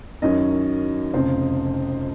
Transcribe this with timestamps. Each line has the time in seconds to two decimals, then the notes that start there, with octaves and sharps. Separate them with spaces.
0.22 F#2 D#3 F#3 C#4 D#5
1.14 F1 F2 C#3 C5